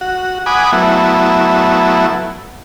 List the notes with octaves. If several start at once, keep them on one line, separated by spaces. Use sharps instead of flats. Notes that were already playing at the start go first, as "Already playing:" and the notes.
F#4
F#5 G#5 B5 D6 D#6
F#3 A3 B3 E4